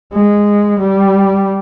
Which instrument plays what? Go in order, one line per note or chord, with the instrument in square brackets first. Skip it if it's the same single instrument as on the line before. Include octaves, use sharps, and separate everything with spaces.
[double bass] G#3
G3